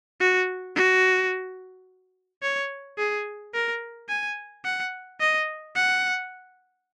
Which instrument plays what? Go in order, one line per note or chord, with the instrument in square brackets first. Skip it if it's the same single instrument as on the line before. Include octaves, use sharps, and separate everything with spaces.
[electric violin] F#4
F#4
C#5
G#4
A#4
G#5
F#5
D#5
F#5